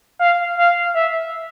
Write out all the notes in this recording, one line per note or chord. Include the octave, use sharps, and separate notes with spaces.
F5
F5
E5